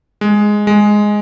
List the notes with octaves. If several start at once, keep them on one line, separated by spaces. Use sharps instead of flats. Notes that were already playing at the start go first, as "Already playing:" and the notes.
G#3
G#3